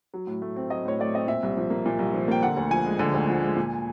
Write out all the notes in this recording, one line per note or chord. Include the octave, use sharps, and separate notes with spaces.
F#3
A2
A3
C4
F#3 D#5
A2 C#5
A3 D5
C4 D#5
A#2 E5
C2
F3
A#3
A#2
C2
F3
A#3 G5
D3 F#5
D2
F3 G#5
G#3
D3 G#5
D2
F3
G#3
A#2